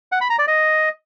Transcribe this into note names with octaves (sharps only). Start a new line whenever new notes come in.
F#5
B5
A#5
D5
D#5